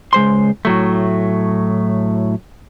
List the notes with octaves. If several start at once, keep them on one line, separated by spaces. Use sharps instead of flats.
C#2 G#3 C5 C6
A2 F#3 A3